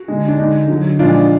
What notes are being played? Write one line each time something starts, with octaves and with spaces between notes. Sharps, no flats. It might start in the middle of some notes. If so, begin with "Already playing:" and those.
Already playing: F#4
D3 G#3
D4
D3 G#3 D#4
D3 F#3
A#2 F3 G#3 D4 F4